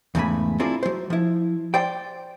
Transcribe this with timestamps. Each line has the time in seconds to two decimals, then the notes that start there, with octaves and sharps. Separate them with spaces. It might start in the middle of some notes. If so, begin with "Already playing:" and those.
0.15 E2 G#2 C#3 A3 G#5 B5
0.59 A#3 C4 D4 E4 F4 G#4
0.83 F#3 C5
1.10 F3 E4
1.74 C5 D5 G5